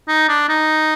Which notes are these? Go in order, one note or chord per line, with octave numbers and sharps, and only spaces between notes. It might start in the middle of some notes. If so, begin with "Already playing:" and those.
D#4
D4
D#4